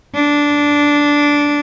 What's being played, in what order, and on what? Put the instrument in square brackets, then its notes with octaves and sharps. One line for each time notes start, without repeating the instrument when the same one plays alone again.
[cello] D4